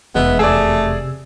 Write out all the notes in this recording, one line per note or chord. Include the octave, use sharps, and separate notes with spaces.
F1 E2 G#3 B3 E5
C3 A3 G#4 D5 E6